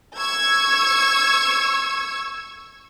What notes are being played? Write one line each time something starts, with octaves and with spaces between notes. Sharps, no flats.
C#6 E6 G#6